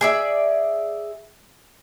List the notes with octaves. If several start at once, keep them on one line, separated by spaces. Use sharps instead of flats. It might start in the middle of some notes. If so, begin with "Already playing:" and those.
G#4 D5 E5